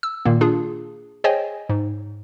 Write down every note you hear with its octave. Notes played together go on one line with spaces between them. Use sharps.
E6
A#2 D#3 A#3
D4 F4 G#4
G#4 C5 C#5 D#5 G5 G#5
G#2